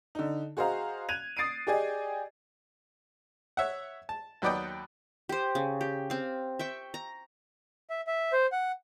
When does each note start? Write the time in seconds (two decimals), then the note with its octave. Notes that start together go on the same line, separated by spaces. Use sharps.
0.15 D3 D#4
0.57 F#4 G#4 C5 D#5 F5 A#5
1.09 F#6 G#6 D#7 F7
1.37 D#6 A6 C7 D7 D#7
1.67 G4 G#4 D5 D#5 G#5
3.57 C#5 E5 F#5
4.09 A5
4.42 D#2 F#3 B3 D5 D#5 G5
5.29 G4 C5
5.55 C#3
5.81 G4
6.10 C4 F5
6.59 E5 G5 C#6
6.94 A#5
7.89 E5
8.07 E5
8.33 C5
8.52 F#5